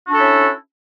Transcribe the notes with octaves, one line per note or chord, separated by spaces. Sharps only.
C#4 D4 E4 F#4 A4